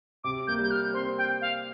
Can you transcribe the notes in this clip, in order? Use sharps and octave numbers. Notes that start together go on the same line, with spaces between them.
C3 D6
A#3 G6
G3 G6
F6
C4 C6
G5
F5